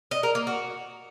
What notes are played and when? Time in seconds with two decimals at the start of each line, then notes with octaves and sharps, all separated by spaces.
0.11 D#5
0.23 A#4
0.35 A#3
0.47 F#4